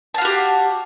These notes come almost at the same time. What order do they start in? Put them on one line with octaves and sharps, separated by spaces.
A5 F5 F#4 G4